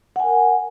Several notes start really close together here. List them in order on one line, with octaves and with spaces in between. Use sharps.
F#5 G#5 A#4